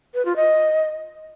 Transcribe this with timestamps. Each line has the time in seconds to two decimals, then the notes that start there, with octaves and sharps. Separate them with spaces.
0.15 B4
0.25 F4
0.36 D#5